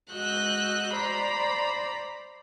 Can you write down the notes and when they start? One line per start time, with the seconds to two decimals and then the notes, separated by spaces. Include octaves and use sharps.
0.12 G#3 F#4 D#5 E6 F#6 G6
0.95 C5 D5 A#5 B5